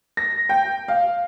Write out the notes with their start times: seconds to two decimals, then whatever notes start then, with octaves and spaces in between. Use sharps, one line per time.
0.17 A#6
0.49 G5
0.88 F5